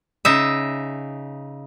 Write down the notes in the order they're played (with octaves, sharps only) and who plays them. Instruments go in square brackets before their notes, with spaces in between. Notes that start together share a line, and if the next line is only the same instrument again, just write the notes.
[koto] C#3 D#4 E5